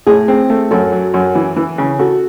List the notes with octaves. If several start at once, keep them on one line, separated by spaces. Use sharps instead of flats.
A2 G#4
C4
A3
F#2 A4
F#3
F#2
E3
E3
C#3
F#4 A4